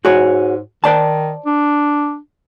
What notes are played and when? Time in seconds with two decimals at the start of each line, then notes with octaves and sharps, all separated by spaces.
0.05 G#2 F#4 G#4 C#5
0.84 D#3 C5 D5 A5
1.46 D4